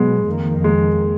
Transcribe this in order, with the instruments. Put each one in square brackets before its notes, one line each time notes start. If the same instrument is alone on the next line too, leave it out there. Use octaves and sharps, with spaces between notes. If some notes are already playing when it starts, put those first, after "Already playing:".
Already playing: [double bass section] B2 F#3 B3 [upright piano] G#3
[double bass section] F2 D#3 A#3
[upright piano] G#3